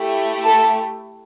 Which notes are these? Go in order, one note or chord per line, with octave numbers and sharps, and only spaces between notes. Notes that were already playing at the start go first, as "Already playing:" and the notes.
Already playing: A3 E4 G4
A4 A5